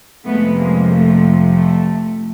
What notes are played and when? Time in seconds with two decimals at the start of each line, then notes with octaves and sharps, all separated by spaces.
0.25 F2 C3 F3 G#3 A3 B3
0.58 G#3 A#3
0.90 A3
1.53 A3